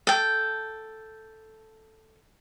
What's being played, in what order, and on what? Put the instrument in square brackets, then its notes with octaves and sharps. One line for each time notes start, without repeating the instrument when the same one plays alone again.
[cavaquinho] A4 G5